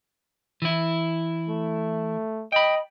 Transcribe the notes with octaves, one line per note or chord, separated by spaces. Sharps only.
E3 E4
A3
D#5 G5 B5